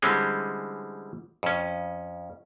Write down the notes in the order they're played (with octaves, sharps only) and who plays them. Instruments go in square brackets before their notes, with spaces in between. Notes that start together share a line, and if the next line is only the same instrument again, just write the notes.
[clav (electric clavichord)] D3 E3 G3 G#3 C4 C#4
F2 C#4